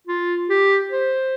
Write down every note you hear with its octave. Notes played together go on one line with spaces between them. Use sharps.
F4
G4
C5